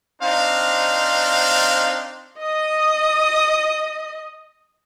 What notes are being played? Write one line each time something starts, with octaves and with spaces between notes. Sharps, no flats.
C4 D4 D#4 C5 F5
D#5 D#6